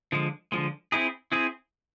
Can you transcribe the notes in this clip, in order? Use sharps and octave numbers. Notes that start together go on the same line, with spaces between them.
D3 F3 G#3
D3 F3 G#3
C4 E4 G#4
C4 E4 G#4